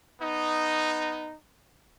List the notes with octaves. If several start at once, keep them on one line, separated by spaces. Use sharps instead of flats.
B3 D#4